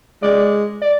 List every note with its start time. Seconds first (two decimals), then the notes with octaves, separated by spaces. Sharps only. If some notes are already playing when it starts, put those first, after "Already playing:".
0.22 G#3 D5
0.82 D5